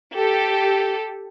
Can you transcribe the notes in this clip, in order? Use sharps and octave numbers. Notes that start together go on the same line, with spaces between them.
G4 A4